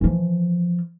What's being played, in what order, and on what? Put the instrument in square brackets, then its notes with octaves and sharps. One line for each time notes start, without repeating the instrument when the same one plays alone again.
[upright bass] E3 F3